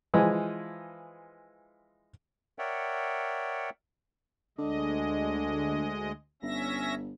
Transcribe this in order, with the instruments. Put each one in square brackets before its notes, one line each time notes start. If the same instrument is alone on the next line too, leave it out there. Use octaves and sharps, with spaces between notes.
[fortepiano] E3 F3 G#3
[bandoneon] A#4 C#5 D5 E5 F#5 G5
[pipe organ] D2 G#3 D#5 [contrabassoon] D3
[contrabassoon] G1 [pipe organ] C#4 E5 A#6